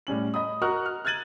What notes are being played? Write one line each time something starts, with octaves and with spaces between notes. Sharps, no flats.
A2 G3 C#4 F#7
D#5 B5 D#6
F#4 A#4 D#5 C#6 F6 F#6
F6
F6 F#6 G#6 A6 D#7 F#7